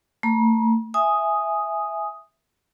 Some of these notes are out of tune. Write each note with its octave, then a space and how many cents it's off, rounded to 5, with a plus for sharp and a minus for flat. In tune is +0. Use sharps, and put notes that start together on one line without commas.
A3 +35 A#5 +45
E5 +0 G#5 +0 D#6 +0